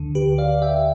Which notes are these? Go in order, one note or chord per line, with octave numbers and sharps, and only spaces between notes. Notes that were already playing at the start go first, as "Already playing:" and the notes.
Already playing: D2 D3
G4 B4
D5 F5
E5 G5